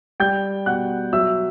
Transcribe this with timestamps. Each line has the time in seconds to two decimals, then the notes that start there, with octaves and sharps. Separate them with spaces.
0.20 G3 G5 G6
0.66 B2 F#5 F#6
1.13 F#3 E5 E6